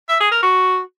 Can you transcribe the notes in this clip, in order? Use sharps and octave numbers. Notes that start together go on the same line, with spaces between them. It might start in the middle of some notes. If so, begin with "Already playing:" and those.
E5
G#4
A#4
F#4